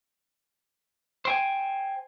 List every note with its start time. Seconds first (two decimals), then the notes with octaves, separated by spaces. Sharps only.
1.25 C5 G5 G#5